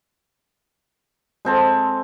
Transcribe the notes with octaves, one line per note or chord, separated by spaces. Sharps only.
G#3 C4 A4